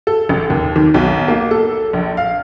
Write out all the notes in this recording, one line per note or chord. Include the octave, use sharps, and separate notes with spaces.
A4
A1
D#2
D#3
B1
A#3
A4
A#1
F5